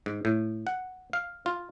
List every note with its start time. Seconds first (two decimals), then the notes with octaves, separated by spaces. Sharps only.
0.06 G#2
0.25 A2
0.67 F#5
1.13 F5
1.46 F4